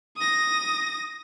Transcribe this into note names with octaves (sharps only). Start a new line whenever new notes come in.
D#6 A#6